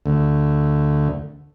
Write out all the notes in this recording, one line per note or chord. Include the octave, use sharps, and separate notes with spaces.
D2